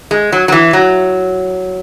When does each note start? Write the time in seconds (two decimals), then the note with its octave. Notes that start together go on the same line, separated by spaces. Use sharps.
0.11 G#3
0.32 F#3
0.48 F#3
0.52 E3
0.73 F#3